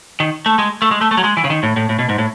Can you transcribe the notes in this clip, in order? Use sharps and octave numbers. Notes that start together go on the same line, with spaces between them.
D#3
A3
G#3
A3
G#3
A3
A3
F#3
G#3
E3
C#3
D#3
A2
A2
A2
B2
G#2
A2